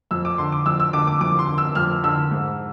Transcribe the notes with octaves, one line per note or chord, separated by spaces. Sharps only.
F2 E6
D6
D3 C6
D6
F2 E6
E6
D3 D6
D6
F2 D6
C6
D3
E6
F2 F6
D3 E6
G#2